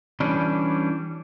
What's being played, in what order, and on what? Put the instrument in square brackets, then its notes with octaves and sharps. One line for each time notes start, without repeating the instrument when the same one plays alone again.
[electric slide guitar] E3 G3 C#4 D4